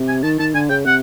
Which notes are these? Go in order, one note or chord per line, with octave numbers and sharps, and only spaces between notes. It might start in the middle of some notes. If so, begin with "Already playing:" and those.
Already playing: C3
G#5
D#3 A5
D#3 A5
D3 G#5
C#3 G5
C3 F#5